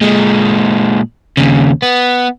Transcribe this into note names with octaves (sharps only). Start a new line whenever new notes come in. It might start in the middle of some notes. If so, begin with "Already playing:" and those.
A#2 G#3
D#2 C#3
B3